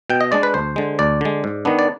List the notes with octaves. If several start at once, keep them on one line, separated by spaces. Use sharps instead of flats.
B2 G5
D#5
G#3 D4 D5
B4
D2 C5
D3 G#3
D2 D5
D3 G#3
G#2
D#3 B3 D4
D5